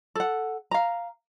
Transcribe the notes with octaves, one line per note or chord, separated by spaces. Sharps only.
A4 F#5
F5 A#5